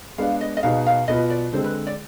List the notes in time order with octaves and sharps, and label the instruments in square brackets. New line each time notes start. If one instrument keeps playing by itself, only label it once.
[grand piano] G#3 B3 D4 [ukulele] F5
[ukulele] D#5
D#5
[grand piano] B2 B3 D#4 G#4 [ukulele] F5
[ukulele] F5
[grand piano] B2 B3 F4 B4 [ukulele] D#5
[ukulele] D5
[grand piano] D3 G#3 C4 [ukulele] C5
[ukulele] B4
D5